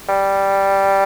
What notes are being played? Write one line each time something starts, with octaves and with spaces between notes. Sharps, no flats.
G3